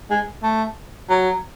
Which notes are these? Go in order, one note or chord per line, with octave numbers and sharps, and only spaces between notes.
G#3
A3
F#3